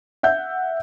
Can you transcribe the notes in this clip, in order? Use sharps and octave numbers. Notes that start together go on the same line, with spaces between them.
E5 F#5 G6